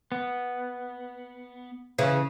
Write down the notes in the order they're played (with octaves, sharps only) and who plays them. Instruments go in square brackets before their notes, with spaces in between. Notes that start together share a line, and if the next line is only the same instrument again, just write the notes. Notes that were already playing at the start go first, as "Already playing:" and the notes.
[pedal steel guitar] B3
[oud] C#3 E3